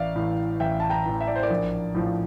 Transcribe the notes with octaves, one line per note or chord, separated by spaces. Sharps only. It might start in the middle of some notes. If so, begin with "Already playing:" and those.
Already playing: A1 D5 E5 F5
A2 E3
A1 E5 G5
A5
G5 A#5
A2 E3
E5
D5
C5
A#4 D5
A#1
A2 F3